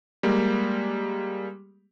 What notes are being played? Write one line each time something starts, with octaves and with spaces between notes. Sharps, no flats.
G3 G#3 A#3